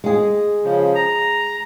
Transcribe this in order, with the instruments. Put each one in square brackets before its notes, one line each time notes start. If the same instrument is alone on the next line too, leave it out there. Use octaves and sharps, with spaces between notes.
[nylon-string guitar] G#3 G#4
[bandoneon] C#3 F3
A#5